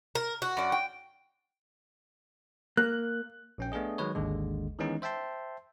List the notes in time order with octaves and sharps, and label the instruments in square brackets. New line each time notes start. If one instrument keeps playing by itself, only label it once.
[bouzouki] A#4
F#4
[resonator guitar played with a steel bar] F#2 D5
G5
[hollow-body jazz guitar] A#3 [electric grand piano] F#6
[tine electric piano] A#1 C#4 G5
A3 B3 D4 G#4 D#5
D#3 F#3 G#3 B4 C#5
G#1 D#2 D3 G#3
D#3 E3 G#3 B3 C#4 D#4
C5 E5 G5 A5 C6